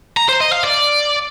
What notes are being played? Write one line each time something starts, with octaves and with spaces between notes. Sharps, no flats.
A#5
C5
D#5
F5
D5